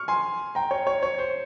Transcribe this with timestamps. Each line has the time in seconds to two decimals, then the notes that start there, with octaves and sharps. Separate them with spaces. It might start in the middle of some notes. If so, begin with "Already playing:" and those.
Already playing: C#6 F6
0.08 G#5 C6
0.55 G5 A#5
0.71 C#5
0.87 C#5
1.03 C#5
1.19 C5